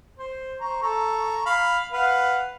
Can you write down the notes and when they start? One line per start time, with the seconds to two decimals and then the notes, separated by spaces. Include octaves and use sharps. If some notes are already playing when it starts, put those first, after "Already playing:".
0.18 C5
0.61 C5 A#5 C#6
0.83 A4 A#5 C#6
1.46 F5 B5
1.92 B4 F5 F#5